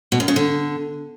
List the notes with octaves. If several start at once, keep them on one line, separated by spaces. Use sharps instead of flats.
B2
F#2
C#3
D3